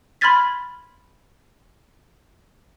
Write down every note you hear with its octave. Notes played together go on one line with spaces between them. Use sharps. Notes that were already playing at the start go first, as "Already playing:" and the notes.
B5 C6 F6 G#6 A6 B6